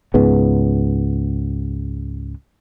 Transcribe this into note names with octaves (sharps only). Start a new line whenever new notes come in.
C#2 G#2 G#3 B3